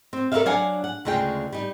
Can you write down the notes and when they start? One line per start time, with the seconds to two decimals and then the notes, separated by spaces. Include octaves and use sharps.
0.13 C4
0.32 A4 A#4 C5 D5 E5 F5
0.46 F#3 D4 C#5 F5 F#5 G#5
0.84 F#5
1.05 D2 C#3 G#3 F4 G5
1.52 G3 D#4